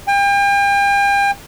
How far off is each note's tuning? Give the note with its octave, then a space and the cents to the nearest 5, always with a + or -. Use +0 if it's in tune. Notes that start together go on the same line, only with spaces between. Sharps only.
G5 +40